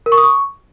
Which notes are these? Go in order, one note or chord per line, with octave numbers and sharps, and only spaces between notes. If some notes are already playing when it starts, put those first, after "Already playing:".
A#4
C#6
D#6
C#6